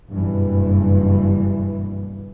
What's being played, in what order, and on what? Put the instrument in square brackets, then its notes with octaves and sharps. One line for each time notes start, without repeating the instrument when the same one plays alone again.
[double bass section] F#1 G2 B2 E3